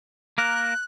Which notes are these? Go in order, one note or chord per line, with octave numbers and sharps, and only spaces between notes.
A#3 A#4 F#6